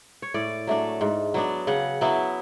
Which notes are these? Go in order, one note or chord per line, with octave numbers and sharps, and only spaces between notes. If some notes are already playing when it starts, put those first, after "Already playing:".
C#5
A2 D5
F#3 A3 D4
G#2
F#3 B3 D4
C#3 F#5
F#3 B3 E4